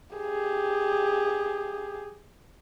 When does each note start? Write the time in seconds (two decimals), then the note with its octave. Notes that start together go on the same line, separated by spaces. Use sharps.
0.16 G4 G#4